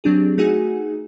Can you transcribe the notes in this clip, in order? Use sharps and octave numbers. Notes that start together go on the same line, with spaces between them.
F#3 C4 D4 G4 G#4
A3 D#4 F#4 G#4 F#5 G#5